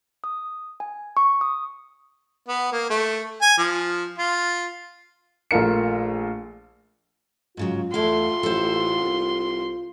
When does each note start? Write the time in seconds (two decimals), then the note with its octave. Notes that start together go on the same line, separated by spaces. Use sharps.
0.24 D#6
0.80 G#5
1.17 C#6
1.41 D#6
2.48 B3
2.72 A#3
2.90 A3
3.42 G#5
3.58 F3
4.18 F4
5.51 A#1 A3 F4 A#4 C#7
7.57 G#2 C#3 F#3 F4
7.94 E2 A3 E4 F5 C6
8.43 A1 A4 C5
9.01 C2